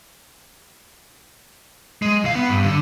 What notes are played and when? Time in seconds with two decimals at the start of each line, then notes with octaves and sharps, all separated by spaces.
2.02 G#3
2.24 C#2 F5
2.35 B3
2.49 G2
2.64 D3